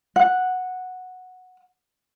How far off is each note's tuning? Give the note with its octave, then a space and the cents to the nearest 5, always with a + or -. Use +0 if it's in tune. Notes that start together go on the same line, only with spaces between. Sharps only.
F#5 -5